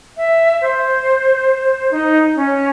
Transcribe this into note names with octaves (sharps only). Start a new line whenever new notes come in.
E5
C5
D#4
C#4